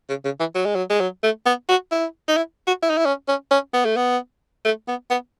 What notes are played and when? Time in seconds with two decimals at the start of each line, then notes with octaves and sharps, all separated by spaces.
0.09 C#3
0.25 C#3
0.40 E3
0.55 F#3
0.65 G#3
0.75 F#3
0.90 G#3
1.00 F#3
1.23 A3
1.46 B3
1.69 F#4
1.91 E4
2.28 D#4
2.37 E4
2.67 F#4
2.82 E4
2.90 D#4
2.97 E4
3.06 C#4
3.28 C#4
3.51 C#4
3.73 B3
3.85 A3
3.97 B3
4.65 A3
4.88 B3
5.10 B3